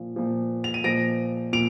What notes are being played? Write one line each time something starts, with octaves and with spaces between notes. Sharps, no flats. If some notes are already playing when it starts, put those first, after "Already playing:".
Already playing: A#2 F3
A#2 F3
F7
D#7
A#2 F3 A#6 D7
A#2 D7 F7